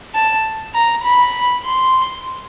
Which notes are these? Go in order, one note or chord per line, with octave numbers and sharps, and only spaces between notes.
A5
A#5
B5
C6